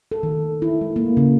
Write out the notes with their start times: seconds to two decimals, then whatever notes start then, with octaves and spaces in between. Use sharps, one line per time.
0.12 A4
0.23 D#3
0.62 E4
0.81 G#3
0.96 A#3
1.17 C#3